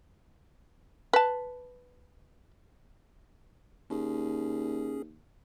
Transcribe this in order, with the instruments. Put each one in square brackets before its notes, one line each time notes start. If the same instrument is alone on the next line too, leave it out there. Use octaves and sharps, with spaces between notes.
[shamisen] B4 A5
[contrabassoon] D#2 [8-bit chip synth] C#4 G#4